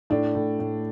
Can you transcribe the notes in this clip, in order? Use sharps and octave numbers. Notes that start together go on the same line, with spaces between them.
A2 D4
A2
A2